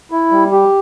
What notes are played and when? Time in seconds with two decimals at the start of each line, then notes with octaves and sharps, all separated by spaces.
0.11 E4
0.31 G3
0.52 G4